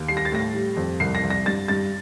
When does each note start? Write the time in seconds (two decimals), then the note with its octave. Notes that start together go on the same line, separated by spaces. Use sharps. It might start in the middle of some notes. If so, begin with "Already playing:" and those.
Already playing: D#2
0.08 G3 C7
0.17 A#6
0.25 A6
0.32 A2 A#6
0.54 G3
0.76 F2
1.00 C2 C7
1.15 A#6
1.23 C2
1.30 A#6
1.46 G2 A6
1.68 G2 A6